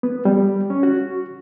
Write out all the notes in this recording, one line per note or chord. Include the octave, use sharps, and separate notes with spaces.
B3
G3
C#4
F#4